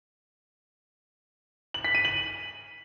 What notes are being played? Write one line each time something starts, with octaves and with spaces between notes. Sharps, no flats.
F#7
B6
D#7
F#7